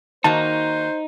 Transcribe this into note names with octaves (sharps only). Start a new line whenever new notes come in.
D#3 A#3 D#4 F#4 C5 A5